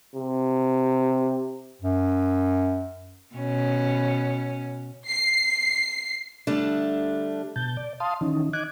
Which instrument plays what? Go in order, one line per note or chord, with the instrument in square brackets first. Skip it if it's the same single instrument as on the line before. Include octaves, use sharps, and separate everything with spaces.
[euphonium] C3
[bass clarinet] F#2
[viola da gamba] B2 C#4
[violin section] C7
[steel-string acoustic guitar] D3 G3 A3 D4
[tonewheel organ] B2 A5 G6
D5
F5 A5 C6 D#6
D#3 E3 C#4 D#4
D#5 D6 F#6 G#6